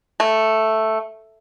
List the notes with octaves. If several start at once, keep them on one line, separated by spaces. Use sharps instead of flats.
A3